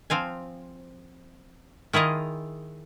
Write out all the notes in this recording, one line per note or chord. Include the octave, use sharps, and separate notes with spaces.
F3 C4 F5 G#5
D#3 E4 F4 G#4 D#5